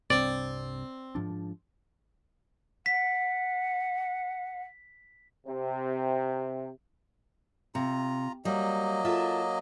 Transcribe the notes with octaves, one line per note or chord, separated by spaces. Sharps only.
C2 G2 C3 C4 D5
G#2 F3 D4
F#5 B6
C3
C3 F4 A#5
F#3 G3 A#3 D#5
F4 A4 E5